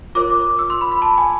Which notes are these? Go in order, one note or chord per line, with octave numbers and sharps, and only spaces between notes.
F4 A#4 C#5 D6
E6
C6
B5
B5
A5
G#5